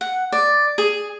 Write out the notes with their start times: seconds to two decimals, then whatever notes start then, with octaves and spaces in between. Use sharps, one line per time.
0.01 F#5
0.32 D5
0.78 G#4